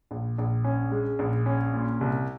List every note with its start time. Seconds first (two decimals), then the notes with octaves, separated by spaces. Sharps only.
0.11 A#1
0.38 A#1
0.64 C#4
0.91 G#3
1.19 A#1
1.46 C#4
1.74 A#2
2.01 C2